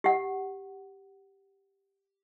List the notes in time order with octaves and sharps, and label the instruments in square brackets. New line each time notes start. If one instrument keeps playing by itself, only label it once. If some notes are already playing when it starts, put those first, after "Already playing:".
[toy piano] G4 F#5